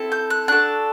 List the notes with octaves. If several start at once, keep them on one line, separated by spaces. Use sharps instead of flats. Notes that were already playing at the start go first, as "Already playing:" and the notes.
Already playing: C4 E4 A4
G6
F#6
D4 F#4 A4 F#6